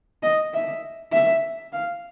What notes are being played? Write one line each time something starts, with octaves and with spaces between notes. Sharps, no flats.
D#5
E5
E5
F5